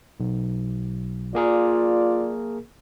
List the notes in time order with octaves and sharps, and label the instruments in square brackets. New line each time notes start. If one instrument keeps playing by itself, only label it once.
[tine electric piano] B1
[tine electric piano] A#3 G#4 A#4 [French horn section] F4 D5